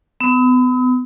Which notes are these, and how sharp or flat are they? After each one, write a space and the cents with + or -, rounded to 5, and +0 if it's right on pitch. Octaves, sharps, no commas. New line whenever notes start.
B3 +35 D#6 +45